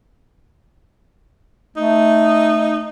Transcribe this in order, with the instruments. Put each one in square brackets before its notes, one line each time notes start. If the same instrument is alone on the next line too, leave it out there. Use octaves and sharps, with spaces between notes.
[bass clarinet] A3 [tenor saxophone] D#4